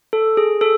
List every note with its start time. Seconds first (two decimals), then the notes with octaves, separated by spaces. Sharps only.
0.13 A4
0.37 G#4
0.61 A4